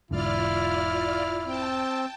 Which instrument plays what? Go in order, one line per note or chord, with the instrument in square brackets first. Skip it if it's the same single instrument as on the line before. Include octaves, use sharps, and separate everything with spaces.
[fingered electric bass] E1 G#2 D3 [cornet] E4 [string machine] F4 D5 F6
[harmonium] C4 [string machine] G5 A5